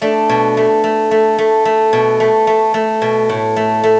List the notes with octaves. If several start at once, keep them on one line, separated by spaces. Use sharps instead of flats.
A3 D4
B2
A3
A3
A3
A3
A3
B2
A3
A3
A3
B2
A2
A3
A3